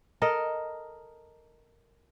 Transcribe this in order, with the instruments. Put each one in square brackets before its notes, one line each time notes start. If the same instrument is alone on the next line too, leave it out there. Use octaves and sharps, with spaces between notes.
[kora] A4 A#4 D#5